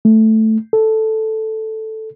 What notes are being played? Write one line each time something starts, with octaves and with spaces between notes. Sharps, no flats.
A3
A4